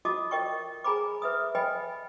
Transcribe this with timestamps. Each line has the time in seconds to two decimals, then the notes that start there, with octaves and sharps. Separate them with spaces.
0.05 F4 F#4 D#5 A5 D6 D#6
0.31 A#4 D#5 G5 C#6
0.84 G#4 G#5 A#5 B5 D6
1.22 B4 E5 D#6
1.55 B4 D#5 G5 G#5 B5